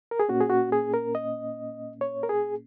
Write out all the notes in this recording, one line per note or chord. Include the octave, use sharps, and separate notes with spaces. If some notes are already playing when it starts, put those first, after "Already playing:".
A#4
G#4
A#2 A#3 C#4 F#4
G#4
F#4
G#4
A#4
D#5
C#5
A#4
G#4